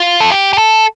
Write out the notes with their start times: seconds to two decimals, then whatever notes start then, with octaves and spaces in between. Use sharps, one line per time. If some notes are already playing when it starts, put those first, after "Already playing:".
Already playing: F4
0.20 A4
0.32 G4
0.53 G4
0.58 A4